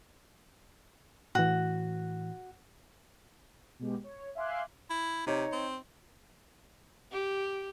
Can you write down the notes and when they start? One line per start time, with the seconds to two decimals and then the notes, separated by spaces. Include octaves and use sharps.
1.35 A2 E3 F#4
3.79 B2 G#3 G4
4.04 C#5
4.35 E5 F5 G#5 C6 D6 F#6
4.90 E4
5.27 C3 D#4 C#5
5.52 C4
7.11 G4